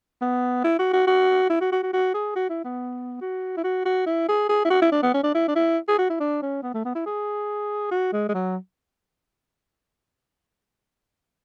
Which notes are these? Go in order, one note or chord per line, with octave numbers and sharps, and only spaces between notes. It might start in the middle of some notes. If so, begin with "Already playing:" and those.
B3
E4
F#4
F#4
F#4
E4
F#4
F#4
F#4
F#4
G#4
F#4
E4
B3
F#4
E4
F#4
F#4
E4
G#4
G#4
E4
F#4
E4
D4
B3
C#4
D4
E4
D4
E4
G#4
F#4
E4
D4
C#4
B3
A3
B3
E4
G#4
F#4
G#3
G#3
F#3